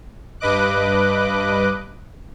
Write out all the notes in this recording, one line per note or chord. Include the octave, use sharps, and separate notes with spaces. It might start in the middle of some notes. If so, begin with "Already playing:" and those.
G2 B4 D#5 D6 F#6